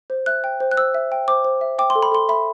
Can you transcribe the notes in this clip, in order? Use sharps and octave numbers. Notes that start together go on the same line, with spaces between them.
C5
E5 F#6
G5
C5
F#6
C5 E6
E5
G5
C5 D6
C5
E5
G5 D6
C6
A4
B5
A4 C6
E5 B5